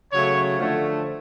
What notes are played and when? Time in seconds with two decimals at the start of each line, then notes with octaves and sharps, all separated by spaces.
0.12 C#3 F#3 A3 C#5
0.59 D3 F3 A3